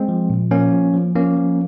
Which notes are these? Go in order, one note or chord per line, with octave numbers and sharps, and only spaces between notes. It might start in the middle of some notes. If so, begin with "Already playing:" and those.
Already playing: G#3 C4
F3
A#2
F3 A#3 C#4
F3
F3
F3 A#3 C#4
F3